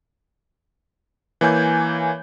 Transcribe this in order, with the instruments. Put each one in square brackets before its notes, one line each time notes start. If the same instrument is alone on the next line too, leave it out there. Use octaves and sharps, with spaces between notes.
[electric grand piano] E3 A#3 C#5 G#5 G6